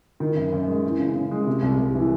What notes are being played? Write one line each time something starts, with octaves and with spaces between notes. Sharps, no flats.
D#3
F#2
F#2
G#3
E3
C#3
C#3
G#3
C3
C2
C2
E3